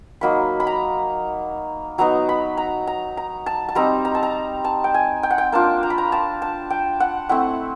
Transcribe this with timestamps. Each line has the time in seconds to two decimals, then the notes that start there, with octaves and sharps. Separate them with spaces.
0.21 F#3 A#3 D#4 B5
0.60 B5
0.67 A#5
1.98 F#3 B3 D#4 A#5
2.29 B5
2.57 A#5
2.87 A#5
3.17 A#5
3.46 A5
3.69 A5
3.75 G3 C4 D#4 A#5
4.05 A#5
4.15 A5
4.23 A#5
4.64 A5
4.84 G5
4.94 G#5
5.23 G5
5.30 F#5
5.38 G5
5.52 A#3 D4 F4 A5
5.83 A#5
5.90 B5
5.98 A#5
6.12 A5
6.42 A5
6.70 G5
7.00 F#5
7.29 A3 C4 E4 F#5